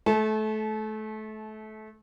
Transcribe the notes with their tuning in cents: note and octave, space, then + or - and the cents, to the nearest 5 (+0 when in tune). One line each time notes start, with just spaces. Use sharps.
A3 -25 A5 -35